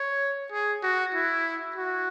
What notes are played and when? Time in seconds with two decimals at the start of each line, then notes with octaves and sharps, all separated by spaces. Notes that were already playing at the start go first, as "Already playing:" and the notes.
Already playing: C#5
0.52 G#4
0.83 F#4
1.14 E4
1.76 F#4